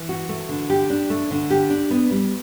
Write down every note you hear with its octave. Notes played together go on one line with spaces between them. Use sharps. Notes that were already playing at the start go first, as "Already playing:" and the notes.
Already playing: E3
F#4
A3
D3
G4
D4
A3
D3
G4
D4
B3
G3